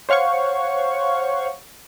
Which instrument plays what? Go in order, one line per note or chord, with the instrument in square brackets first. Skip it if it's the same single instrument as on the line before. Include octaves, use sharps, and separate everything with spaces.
[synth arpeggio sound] C5 C#5 F5 F#5 C#6